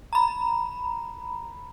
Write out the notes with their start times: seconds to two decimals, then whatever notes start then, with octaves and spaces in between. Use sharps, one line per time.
0.13 A#5 B5